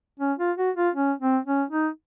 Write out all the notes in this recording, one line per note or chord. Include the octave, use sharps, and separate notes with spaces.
C#4
F4
F#4
F4
C#4
C4
C#4
D#4